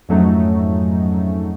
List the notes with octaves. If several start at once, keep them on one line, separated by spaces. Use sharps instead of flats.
F2 G#2 F#3 A3 C#4 D#4